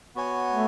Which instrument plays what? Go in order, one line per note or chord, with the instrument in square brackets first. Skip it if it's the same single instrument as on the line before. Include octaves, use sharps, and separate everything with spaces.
[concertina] B3 F#4 C#5 G#5
[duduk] A3